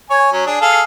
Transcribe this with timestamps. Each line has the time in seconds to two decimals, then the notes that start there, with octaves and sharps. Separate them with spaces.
0.10 C#5 G#5
0.32 F#3 C#4
0.46 D4 G#4
0.61 G#4 A4 F5